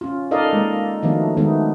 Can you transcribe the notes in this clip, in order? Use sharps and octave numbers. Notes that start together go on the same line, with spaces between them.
C#4 F4
D#4 A4 A#4 D5 D#5 F5
G#3 A#3
D#3 F3 F#3 A3 B3 D4
D#3 G#3 A3 B3 D#4